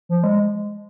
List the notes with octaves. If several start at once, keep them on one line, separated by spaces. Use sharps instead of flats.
F3
G#3